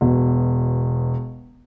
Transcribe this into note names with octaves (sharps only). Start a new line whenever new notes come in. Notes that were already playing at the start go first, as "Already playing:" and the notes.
E1 B2